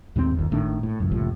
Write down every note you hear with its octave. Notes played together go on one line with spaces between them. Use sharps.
D#2 G#2 G3 C4
G1 D#2
G#1 A2 D#3 D4
A2
C#2 F#2
F#1 C2 A2 F3